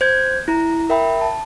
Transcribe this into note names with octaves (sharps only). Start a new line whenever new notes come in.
C5 G6 G#6
E4 A#5
A#4 E5 G5 B5
A5